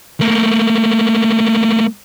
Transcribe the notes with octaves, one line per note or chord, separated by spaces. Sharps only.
A3 A#3